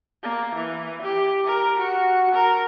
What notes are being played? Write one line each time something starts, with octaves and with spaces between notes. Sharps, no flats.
A#3
E3
G4
A#4
F#4
A#4